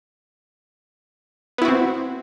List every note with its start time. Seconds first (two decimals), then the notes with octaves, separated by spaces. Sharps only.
1.58 B3
1.62 E4
1.65 F#4
1.68 C4